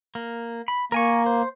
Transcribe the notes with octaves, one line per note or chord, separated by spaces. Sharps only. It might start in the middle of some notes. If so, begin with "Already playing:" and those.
A#3
B5
A#3 A#4 G#5 C#6
C5